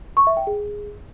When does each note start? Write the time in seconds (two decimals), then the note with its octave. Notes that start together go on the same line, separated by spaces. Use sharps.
0.17 C#6
0.27 E5
0.37 G5
0.47 G#4